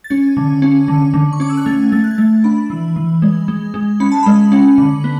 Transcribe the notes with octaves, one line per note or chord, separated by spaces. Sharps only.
A6
C#4 G#6
D3
C#4
D3
D3
C#6
C#4 D6
E6
F#6
A3 G#6
A3 A6
F#6
G#6
A3 A6
D4 B5
E3
E3
G#3
G#3
G#3
C#4 B5
A5
G#3 B5
C#4
D3
B3